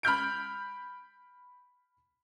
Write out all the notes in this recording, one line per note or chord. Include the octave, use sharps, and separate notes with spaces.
B5 F6 G6 D7